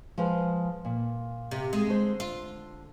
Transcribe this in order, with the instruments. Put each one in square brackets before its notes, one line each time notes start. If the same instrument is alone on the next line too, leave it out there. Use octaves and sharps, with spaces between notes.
[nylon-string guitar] F3 G#3 B4
A#2
[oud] C3
G#3
[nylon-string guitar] D3 C5
[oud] F4